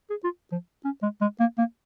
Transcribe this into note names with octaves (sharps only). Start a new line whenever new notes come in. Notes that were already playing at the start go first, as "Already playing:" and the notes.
G#4
F4
F3
C#4
G#3
G#3
A#3
A#3